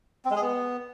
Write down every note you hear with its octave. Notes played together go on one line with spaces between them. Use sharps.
C4
G#3
G#4
B3